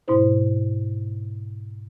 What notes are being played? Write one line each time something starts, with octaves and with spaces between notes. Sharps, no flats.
G#2 B2 E4 C5